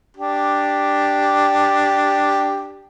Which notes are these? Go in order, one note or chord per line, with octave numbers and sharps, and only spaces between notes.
D4 G4